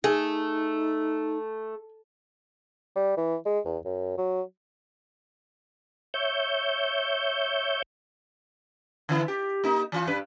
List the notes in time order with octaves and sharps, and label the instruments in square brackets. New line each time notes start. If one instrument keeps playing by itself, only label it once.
[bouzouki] A3 [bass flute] D#4 [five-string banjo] G#4
[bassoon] G3
E3
G#3
E2
F#2
F#3
[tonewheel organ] C#5 E5 G6
[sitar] D3 E3 E4
G4
A#3 D#4
E3 F4
G2 B4